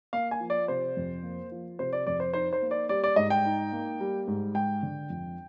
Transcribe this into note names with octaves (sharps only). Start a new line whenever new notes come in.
A#3 F5
G#5
F3
D5
C3 C5
F2
A#3
F3
C3 C5
D5
F2 D5
C5
D#4 C5
C5
A#3
D5
G3 D5
D5
G#2 D#5
G5
D#4
A#3
G3
G#2
G#3 G5
D3
F2